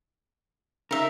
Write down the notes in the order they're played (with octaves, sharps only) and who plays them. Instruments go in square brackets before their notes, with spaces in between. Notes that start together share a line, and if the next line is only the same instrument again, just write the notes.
[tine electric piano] C#3 [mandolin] D#4 E5 [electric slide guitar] A#4